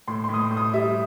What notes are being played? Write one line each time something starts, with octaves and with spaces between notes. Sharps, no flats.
A2 C6
C6
A2 D#6
C6
A2
D#6
G3 E5